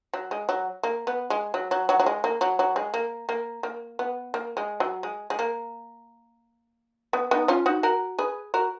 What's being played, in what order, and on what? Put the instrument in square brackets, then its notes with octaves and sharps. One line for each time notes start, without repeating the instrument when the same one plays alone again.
[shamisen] F#3
G#3
F#3
A#3
B3
G#3
F#3
F#3
F#3
F#3
G#3
A#3
F#3
F#3
G#3
A#3
A#3
A#3
B3
A#3
G#3
F#3
G#3
G#3
A#3
B3
B3 D#4
C#4 F4
D#4 F#4
F#4 A#4
G#4 B4
F#4 A#4